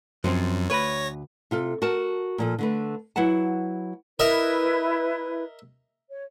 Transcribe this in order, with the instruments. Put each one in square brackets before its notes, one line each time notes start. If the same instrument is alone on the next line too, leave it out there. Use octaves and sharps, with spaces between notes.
[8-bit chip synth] F#2 [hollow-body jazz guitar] F3 F#3 C4
[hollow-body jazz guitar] D2 B4 [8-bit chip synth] C#5 A#6
[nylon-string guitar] C3 F4 A4
F#4 A#4 A5
A#2 F3 A4
D3 A3 B4
F#3 E4 B4 F#5 A5
[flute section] E4 B4 [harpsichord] A#4 D#5 E5
[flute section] C#5